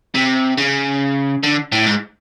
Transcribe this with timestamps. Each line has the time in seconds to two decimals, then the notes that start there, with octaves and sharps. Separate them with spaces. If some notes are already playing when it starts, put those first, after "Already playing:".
0.15 C3
0.58 C#3
1.43 D3
1.72 A2
1.86 G#2